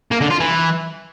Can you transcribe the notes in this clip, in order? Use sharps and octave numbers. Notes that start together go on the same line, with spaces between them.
A#3
D3
F4
E3